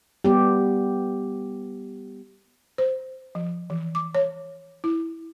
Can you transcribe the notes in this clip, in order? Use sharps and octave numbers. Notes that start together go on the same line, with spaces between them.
G3 B3 G4
C5
F3
E3
D6
C#5
E4